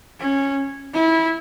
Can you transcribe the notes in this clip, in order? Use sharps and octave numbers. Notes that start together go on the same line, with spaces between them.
C#4
E4